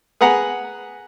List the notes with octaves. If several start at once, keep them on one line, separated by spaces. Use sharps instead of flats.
G#4 B4 F#5 A#5